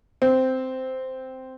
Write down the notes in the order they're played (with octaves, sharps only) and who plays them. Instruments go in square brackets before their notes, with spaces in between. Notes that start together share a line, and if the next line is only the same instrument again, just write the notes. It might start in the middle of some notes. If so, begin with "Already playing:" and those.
[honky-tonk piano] C4